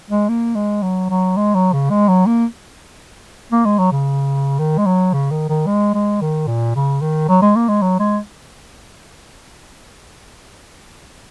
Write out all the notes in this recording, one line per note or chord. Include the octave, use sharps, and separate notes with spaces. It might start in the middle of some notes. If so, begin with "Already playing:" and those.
G#3
A#3
G#3
F#3
F#3
G#3
F#3
C#3
G#3
F#3
A#3
A#3
G#3
F#3
C#3
D#3
G#3
F#3
C#3
D#3
D#3
G#3
G#3
D#3
A#2
C#3
D#3
F#3
G#3
A#3
G#3
F#3
G#3